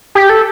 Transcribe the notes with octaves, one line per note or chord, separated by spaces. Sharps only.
G4
A4